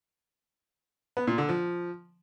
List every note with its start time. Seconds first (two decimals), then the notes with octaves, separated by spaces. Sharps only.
1.17 B3
1.27 A#2
1.38 D3
1.49 F3